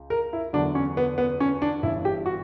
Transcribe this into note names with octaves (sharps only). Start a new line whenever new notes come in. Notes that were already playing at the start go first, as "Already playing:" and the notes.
Already playing: C#2
A#4
E4
E2 D3 F#3 D4
C#4
B3
B3
C#4
D4
G1 G2 E3 E4
G4
F#4